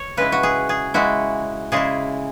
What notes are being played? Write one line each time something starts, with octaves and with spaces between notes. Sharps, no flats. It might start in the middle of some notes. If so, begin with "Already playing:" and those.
Already playing: C#5
C#3 G#3 E4 B4
F#4
G#4
G#4
C#3 G#3 E4 F#4
C#3 G#3 E4 G#4